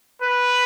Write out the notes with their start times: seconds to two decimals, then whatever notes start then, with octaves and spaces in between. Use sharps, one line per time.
0.22 B4